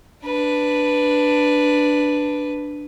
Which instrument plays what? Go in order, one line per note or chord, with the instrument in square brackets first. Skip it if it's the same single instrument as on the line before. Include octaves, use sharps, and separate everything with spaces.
[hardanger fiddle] D4 B4